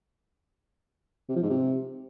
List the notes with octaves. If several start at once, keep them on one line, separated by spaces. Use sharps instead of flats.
C3
F3
G#2
C3